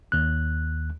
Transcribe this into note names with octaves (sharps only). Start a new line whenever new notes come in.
D#2 F#6